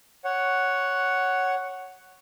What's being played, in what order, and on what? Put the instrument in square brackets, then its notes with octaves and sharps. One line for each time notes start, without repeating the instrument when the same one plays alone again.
[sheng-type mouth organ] C#5 F#5